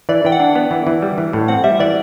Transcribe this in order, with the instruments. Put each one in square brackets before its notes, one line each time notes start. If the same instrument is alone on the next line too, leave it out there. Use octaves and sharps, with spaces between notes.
[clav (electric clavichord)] E3 [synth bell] D5
[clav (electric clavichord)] E3 [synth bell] G5
[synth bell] F#5
[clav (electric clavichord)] D4
B3
E3
E3
G3
E3
A2
[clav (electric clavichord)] C4 [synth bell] F#5
[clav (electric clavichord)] G3 [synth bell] E5
[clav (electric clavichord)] E3 [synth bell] D5